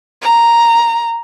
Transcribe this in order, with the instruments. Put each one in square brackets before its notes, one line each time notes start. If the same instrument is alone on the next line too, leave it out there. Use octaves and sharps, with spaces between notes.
[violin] A#5